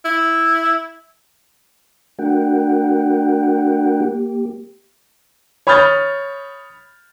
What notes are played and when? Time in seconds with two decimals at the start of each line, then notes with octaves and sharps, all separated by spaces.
0.05 E4
2.19 A3 D4 F#4 A#4 F#5 G5
4.01 A#3 G4
5.67 C#5 B5 D#6 F6 G6 A6